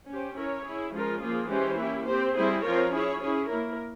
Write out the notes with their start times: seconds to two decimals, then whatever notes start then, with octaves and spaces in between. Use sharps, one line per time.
0.08 C#4 G4 C5
0.36 C#4 E4 A#4 C#5
0.65 C#4 E4 G#4
0.93 F3 G#3 C#4 F4 A#4
1.21 F3 A#3 F4 G#4
1.49 E3 G#3 C#4 G4 C5
1.78 A#3 C#4 E4 G4
2.06 C4 G4 C5
2.34 G3 C4 E4 G#4 C5
2.62 F3 C4 F4 A#4 C#5
2.91 C#4 E4 G#4 C#5
3.19 C#4 E4 G#4 C#5
3.47 A#3 E4 A#4